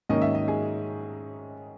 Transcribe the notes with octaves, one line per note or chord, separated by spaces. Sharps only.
G#2 D#3 A#3 C#4 D#5
E5
D#5
G#4